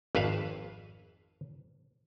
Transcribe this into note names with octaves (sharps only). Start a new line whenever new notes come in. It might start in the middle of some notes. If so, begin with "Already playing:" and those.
G#1 F2 B4 E5 F5